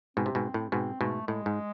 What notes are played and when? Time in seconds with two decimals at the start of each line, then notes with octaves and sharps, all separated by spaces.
0.17 G#2 B2 C4
0.26 C3
0.35 G#2 B2
0.54 A2
0.72 G#2 B2 C4
1.01 G#2 B2 A3
1.27 A2 G#3
1.46 G#2